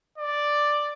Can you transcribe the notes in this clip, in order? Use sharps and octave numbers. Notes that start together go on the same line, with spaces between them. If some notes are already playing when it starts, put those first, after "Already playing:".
D5